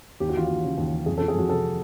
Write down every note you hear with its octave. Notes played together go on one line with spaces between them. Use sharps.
D#2 G4
F#4
E3 F4
D#2 F#4
C#3
D#2
E3
F2 G#4
A4
F3
G#4
F2 F#4
C3 A4